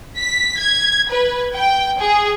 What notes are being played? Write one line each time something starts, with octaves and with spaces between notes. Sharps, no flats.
B6
G#6
B4
G5
G#4